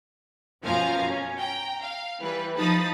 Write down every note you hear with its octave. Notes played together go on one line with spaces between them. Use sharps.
F#2 B2 F3 F5 G#5 A#5
C#4
G5 A#5
F5
E3 G3 B4
F3 D#4 A5 B5 D#6 A6